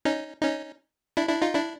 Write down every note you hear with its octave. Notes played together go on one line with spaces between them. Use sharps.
C#4 D#4
C#4 D#4
D4 E4
D4 E4
D#4 F4
D4 E4